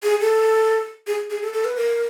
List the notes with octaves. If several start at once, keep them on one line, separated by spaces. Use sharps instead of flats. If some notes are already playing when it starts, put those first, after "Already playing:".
G#4
A4
G#4
G#4
A4
A4
B4
A#4